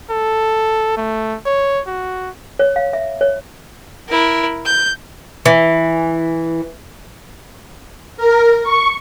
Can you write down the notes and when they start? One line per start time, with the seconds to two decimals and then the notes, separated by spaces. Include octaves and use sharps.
0.10 A4
0.97 A3
1.46 C#5
1.87 F#4
2.59 C#5
2.76 F5
2.93 E5
3.21 C#5
4.08 E4 A#4
4.65 G6
5.46 E3
8.17 A#4
8.63 C#6